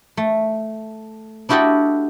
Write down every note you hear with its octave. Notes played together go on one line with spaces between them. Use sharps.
A3
D4 E4 F#4 G4 A4 D#5